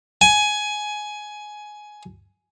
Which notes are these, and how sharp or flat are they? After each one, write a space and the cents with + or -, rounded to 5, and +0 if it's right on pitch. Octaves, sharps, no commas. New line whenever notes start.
G#5 +15